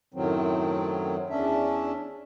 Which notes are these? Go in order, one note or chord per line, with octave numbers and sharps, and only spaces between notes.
F#2 A2 D#3 F#3 C4
E2 C#4 D4 E5